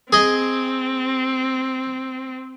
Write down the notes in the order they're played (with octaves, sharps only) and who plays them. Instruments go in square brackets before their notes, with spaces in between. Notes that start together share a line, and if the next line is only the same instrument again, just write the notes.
[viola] C4 [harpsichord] G#4 D#5